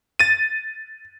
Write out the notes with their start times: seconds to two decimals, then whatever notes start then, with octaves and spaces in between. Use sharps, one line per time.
0.19 A6 D#7